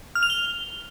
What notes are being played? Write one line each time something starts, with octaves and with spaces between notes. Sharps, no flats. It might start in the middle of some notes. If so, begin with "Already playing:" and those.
F6
F7
G7